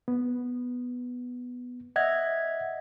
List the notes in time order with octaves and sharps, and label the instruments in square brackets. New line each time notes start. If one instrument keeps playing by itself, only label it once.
[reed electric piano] B3
[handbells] D#5 E5 G#6 [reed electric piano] F#5